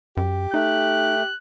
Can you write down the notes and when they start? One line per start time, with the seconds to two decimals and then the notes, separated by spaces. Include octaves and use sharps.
0.17 F#2 G4
0.54 A3 D#4 F#6